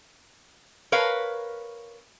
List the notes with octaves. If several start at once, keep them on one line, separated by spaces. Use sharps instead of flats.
A#4 B4 C#5 F5